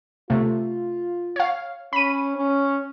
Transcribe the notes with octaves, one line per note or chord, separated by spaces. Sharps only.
C3 A3 F4
C#5 F5
C#4 B5 D#7
C#4